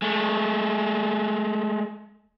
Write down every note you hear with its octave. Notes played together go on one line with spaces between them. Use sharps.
G#3 A3